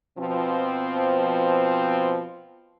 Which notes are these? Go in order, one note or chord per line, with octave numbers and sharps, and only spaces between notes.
B2 F3 C4